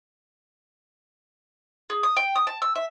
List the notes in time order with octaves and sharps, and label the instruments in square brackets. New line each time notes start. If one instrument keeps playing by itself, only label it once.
[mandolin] G#4
D#6
G5
D#6
A5
E6
E5